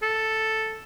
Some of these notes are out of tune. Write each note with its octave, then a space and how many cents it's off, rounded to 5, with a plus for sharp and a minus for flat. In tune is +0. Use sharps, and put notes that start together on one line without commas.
A4 +0